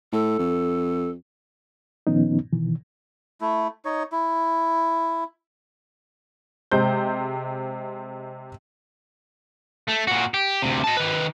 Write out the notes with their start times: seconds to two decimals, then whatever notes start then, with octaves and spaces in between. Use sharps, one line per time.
0.12 A2 A4
0.39 F2
2.07 A#2 D#3 F3 B3 C#4 D#4
2.53 B2 D#3 E3
3.41 A3 E4
3.85 D#4 C#5
4.12 E4
6.72 C3 G#3 C5 G6
9.88 A3
10.07 A#2 F#4
10.34 G4
10.62 D2 C3
10.84 D#5 A5
10.97 D#3 B4